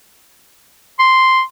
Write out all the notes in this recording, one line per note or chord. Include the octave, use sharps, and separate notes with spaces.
C6